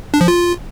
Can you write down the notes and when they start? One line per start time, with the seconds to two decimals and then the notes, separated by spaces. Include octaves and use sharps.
0.14 D4
0.21 F3
0.28 F4